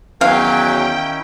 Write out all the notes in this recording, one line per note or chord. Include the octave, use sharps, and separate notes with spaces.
E2 D#3 F#3 C#4 E4 F5 G5